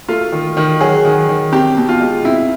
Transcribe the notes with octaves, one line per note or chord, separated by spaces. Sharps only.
A3 F4
D#3
D#3
F#3 G#4
D#3
D#3
C4 G4
B2
F4
G#3
C4 E4